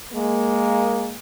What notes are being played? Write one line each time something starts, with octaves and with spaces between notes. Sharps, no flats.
G#3 A#3